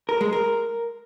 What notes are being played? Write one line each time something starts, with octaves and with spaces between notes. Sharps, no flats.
A#4
G#3
A#4